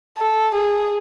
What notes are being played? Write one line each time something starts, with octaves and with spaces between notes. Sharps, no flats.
A4
G#4